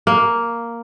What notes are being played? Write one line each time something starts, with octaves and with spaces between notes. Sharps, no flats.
A#3